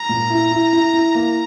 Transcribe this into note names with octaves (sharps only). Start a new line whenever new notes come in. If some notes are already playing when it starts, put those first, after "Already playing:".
Already playing: A#5
A#2
E4
E4
E4
E4
A#3